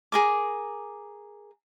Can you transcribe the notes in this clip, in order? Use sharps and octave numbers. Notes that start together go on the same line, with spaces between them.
G#4 A#4 D6